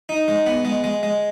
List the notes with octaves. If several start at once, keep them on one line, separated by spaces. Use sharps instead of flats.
D#4
G#3
B3
G#3
G#3
G#3